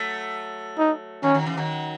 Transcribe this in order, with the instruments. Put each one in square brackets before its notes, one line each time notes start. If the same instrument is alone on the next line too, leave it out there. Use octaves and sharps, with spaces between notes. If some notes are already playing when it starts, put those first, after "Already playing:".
Already playing: [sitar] F#3 A3
[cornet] D#4
[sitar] D#3 F#3 [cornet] C#4
[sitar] D#3 F#3
C#3 E3
D#3 F#3